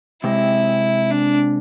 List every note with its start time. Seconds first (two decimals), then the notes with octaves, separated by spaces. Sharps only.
0.24 C3 G#3 C4 E4
1.10 D4